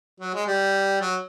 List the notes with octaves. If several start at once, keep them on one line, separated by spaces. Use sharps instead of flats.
F#3
G#3
G3
F#3